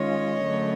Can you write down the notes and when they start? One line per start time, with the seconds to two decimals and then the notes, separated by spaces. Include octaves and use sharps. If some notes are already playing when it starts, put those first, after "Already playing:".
Already playing: D#3 G#3 C#4 F4 C#5 D#5
0.43 F#2 D3 F#3 A3